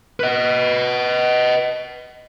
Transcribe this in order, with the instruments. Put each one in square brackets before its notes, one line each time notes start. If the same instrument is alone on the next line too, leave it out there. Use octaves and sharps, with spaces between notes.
[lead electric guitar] B4 D#5